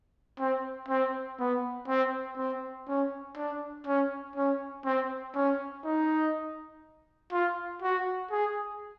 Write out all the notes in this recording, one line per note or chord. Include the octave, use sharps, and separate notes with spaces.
C4
C4
B3
C4
C4
C#4
D4
C#4
C#4
C4
C#4
D#4
F4
F#4
G#4